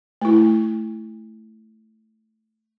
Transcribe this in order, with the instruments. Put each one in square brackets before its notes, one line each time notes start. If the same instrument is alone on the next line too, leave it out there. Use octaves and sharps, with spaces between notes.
[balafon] A3 E4